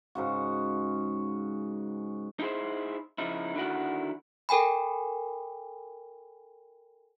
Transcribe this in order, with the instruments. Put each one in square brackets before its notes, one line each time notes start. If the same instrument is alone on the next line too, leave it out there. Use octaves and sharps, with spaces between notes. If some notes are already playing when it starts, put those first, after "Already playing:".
[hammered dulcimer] G#2 C#3 F#4
[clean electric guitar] D#4 E4 G4 G#4 C5
C#3 F3 D#4 E4
D3 D#3 E4 F#4 F#5
[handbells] A4 A#4 G5 G#5 B5